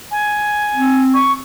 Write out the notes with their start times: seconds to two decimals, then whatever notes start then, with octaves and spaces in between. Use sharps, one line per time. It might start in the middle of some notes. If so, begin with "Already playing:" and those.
0.11 G#5
0.75 C4
1.13 C#6